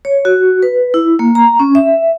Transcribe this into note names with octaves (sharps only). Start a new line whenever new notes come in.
C#5
F#4
B4
E4
A#3
A#5
C#4
E5